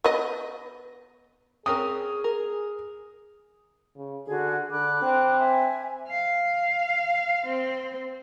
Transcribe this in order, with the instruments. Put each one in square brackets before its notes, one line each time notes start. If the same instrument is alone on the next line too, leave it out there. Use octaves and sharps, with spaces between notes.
[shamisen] B3 D#5
[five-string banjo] C4 C#4 A#4 [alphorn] G#4 [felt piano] D#6
[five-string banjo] A#4
[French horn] C#3
[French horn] D3 [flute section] F#4 G#4
[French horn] D3 [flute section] B5 D6 F#6
[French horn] C4
[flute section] E5 G#5
[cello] F5
C4